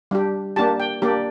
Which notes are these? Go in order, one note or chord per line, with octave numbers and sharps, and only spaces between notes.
G3 D4 G4
A#3 D4 G4 A5
G5
A#3 D4 G4 D5